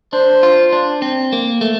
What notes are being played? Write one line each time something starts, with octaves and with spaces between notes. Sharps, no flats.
D4 C5
F4
D4
C4
A#3
A3